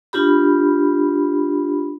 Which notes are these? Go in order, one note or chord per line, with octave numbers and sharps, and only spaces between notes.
D4 F4 G4 B5